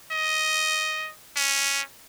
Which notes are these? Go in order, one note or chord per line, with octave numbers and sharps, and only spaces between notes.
D#5
C#4